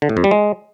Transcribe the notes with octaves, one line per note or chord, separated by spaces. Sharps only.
D3
A2
F2
G3
G#3